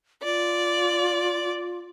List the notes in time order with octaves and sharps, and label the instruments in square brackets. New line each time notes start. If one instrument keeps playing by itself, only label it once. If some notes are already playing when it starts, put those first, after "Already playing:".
[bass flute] F4 [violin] D5